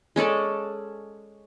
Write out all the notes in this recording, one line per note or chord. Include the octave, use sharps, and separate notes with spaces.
G#3 C#4 A4 D5